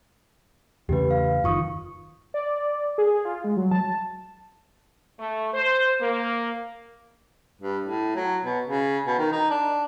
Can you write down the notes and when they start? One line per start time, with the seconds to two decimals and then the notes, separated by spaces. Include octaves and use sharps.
0.89 E2 C#3 A3 G4 B4
1.11 F5
1.44 F#1 D#3 F4 C#6 D#6
2.34 D5
2.98 G#4
3.25 F4
3.44 G#3
3.56 F#3
3.71 A5
5.19 A3
5.54 C5
6.01 A#3
7.62 G2
7.84 A2
8.16 F#3
8.44 B2
8.67 C#3
9.07 B2
9.19 D#3
9.32 D#4
9.50 D4